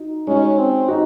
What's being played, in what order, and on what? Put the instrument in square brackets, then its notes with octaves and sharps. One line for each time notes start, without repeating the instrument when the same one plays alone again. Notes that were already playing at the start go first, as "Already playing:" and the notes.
Already playing: [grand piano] D#4 F#4
[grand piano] G#3 D#4 F#4 [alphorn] C#4
[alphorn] C4
[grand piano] D#4 F#4